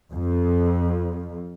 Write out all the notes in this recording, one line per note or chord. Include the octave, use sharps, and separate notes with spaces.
F2